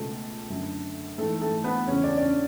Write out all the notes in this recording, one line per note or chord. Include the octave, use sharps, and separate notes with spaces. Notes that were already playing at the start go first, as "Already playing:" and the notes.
Already playing: C#2 B2 A3 A4
F#2 D3
G#2 E3 A3 A4
A3 A4
B3 B4
E2 C#3 E3 C#4 C#5
D4 D5
D5
C#4 C#5